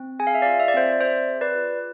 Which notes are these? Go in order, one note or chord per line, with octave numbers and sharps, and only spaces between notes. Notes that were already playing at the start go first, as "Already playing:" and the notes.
Already playing: C4
G#4 G#5
F5
E5
D5 F5
F4
E5
D5
C4 C5 E5
D5
C4 C5 E5
G#4
B4 D5
F4